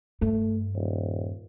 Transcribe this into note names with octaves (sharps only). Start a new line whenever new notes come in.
G2 A3
D#1